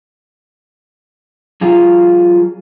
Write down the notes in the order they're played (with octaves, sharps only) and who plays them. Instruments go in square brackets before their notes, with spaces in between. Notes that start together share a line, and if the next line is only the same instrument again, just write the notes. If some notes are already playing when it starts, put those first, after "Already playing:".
[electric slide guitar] F#3 F4 G#4